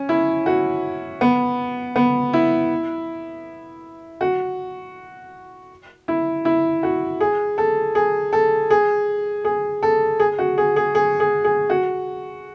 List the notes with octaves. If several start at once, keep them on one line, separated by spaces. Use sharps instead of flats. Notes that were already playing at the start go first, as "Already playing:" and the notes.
Already playing: C#4
E4
F#4
B3
B3
E4
F#4
E4
E4
F#4
G#4
A4
G#4
A4
G#4
G#4
A4
G#4
F#4
G#4
G#4
G#4
G#4
G#4
F#4